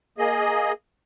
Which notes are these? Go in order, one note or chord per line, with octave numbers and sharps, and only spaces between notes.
A#3 G#4 D#5